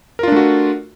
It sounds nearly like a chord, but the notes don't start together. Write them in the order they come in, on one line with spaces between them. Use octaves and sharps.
A#4 F4 D4 A3 F#4